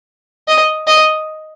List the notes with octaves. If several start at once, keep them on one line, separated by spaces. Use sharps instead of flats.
D#5
D#5